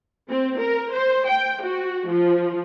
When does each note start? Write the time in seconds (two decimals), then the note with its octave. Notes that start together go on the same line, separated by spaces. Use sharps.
0.30 C4
0.60 A#4
0.93 C5
1.30 G5
1.64 F#4
2.09 F3